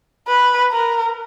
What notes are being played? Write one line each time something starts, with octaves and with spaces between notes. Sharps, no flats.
B4
A#4